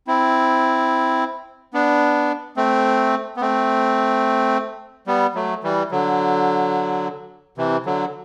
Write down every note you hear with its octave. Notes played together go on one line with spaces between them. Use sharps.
C4 E4
B3 D4
A3 C4
B3
A3 C4
G3 B3
F#3 A3
E3 G3
D3 F#3
C3 E3
D3 F#3